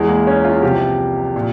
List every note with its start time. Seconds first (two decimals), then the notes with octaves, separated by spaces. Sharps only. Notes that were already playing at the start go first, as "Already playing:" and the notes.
Already playing: E2 E3 G#3
0.09 A#3
0.27 C#4
0.45 F4
0.62 C2 C3 F3 G4
1.36 A#2